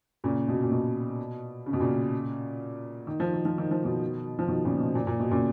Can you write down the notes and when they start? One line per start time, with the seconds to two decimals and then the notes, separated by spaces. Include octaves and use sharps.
0.24 A#2 C#3
0.48 B2
0.63 A#2
0.72 B2
1.66 C#3
1.73 B2
1.80 A#2 C#3
3.07 D#3
3.20 F3
3.33 D#3
3.45 F3
3.58 D#3
3.71 F3
3.84 B2 D#3
4.39 F3
4.48 B2 D#3
4.65 A#2 C#3
4.80 B2
4.95 A#2
5.07 A#2
5.20 B2
5.31 A#2 C#3